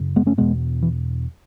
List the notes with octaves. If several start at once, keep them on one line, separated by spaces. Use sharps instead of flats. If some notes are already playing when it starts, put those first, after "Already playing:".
Already playing: F#2 C#3
G#3 B3
A3 C#4
E2 B2 G#3 B3
E3